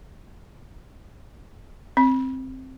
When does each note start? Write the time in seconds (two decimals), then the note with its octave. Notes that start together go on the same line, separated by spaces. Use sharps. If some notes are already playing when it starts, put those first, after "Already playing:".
1.97 C4